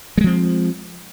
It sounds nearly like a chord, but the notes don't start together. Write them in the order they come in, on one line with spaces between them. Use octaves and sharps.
G3 G#3 F3 C4